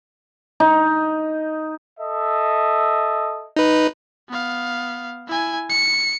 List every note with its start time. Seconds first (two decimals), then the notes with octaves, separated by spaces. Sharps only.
0.60 D#4
2.00 A4 D#5 E5
3.56 D#4 B4
4.29 B3 F5
5.28 E4 G#5
5.70 C#7